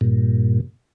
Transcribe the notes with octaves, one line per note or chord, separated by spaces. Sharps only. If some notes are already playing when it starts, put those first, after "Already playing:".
G2 A#2